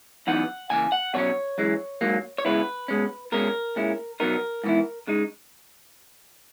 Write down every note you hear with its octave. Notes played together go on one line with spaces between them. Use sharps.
F#2 E3 B3 D#4 F#5
C#3 E3 A#3 G#5
F#5
B2 F#3 C#4 C#5
F#2 E3 G#3
G#2 F#3 A#3
C#5
C#3 G#3 B3 E4 B4
B2 G#3 C#4
B2 G#3 C#4 A#4
A#2 G#3 C#4 E4
B2 F#3 B3 D#4 A#4
G#2 E3 B3 E4
C#3 G#3 D#4